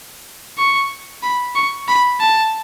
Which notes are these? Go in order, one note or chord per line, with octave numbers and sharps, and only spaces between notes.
C#6
B5
C#6
B5
A5